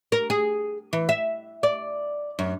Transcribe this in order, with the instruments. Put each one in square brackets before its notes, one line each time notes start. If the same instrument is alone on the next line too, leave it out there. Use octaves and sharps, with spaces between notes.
[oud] A#4
G#4
E3
E5
D5
F#2